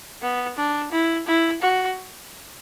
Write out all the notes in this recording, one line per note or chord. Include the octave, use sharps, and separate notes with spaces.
B3
D4
E4
E4
F#4